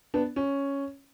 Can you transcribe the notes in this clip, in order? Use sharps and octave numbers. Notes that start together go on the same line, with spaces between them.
B3 D4
C#4